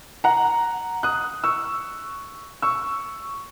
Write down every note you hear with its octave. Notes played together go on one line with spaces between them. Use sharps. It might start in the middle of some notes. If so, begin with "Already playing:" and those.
F#5 A#5
D#6 F#6
C#6 E6
C#6 E6